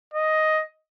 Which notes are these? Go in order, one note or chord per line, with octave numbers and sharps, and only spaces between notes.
D#5